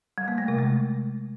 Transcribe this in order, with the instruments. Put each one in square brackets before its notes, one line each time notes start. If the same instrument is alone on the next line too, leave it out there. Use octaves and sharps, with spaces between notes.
[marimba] G3
A#3
A3
C3
G#3